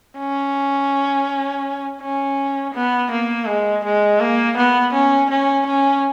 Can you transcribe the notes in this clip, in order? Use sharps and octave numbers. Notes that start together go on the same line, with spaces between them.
C#4
C#4
B3
A#3
G#3
G#3
A#3
B3
C#4
C#4
C#4